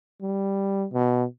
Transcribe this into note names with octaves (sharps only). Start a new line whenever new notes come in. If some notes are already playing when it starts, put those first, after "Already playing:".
G3
B2